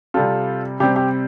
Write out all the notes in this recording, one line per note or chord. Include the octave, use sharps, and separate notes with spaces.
C3 G3 C4 F4 A4
C3 G3 C4 G4
G4